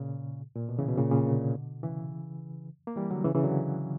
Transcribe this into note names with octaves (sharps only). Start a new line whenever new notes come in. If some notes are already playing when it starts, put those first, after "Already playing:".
Already playing: A#2 C#3
A#2
B2
C#3 E3
B2
A#2 C#3
A#2 C#3
B2 D3
C#3 E3
A#3
E3 G3
D3 F#3
C#3 E3
C#3 E3
D3 F#3